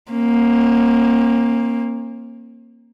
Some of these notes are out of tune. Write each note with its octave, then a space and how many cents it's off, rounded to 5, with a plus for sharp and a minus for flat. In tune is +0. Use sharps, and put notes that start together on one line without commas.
A#3 +5 C#4 -45